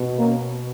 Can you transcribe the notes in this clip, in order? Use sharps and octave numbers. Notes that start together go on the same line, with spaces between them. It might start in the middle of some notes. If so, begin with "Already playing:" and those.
Already playing: B2
A#3 C#4